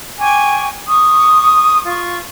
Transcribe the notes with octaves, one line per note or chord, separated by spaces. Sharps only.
G5 G#5 C#6 D6
C#6 D#6
F4 C#6